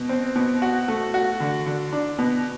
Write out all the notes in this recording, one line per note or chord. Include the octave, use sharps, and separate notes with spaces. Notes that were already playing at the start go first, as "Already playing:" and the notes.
Already playing: B2
C4
B2
F#4
A3
F#4
D3
D3
D4
B2